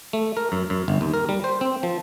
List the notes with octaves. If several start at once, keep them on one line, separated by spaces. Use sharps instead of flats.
A3
A#4
F#2
F#2
G1
D#2
A#4
G3
C5
C4
F3